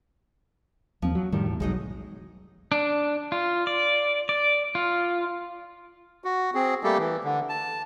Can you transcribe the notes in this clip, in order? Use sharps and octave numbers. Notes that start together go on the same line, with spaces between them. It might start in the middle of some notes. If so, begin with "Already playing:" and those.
D#2 F3 C4
F#3
F2 A2 D#3 G3
E2
F1 B1 F#3 G#3 D#4 D#5
D4
F4
D5
D5
F4
F#4
C4 G#4
G3 A3 A#3 G4 A4
E3
D3
A5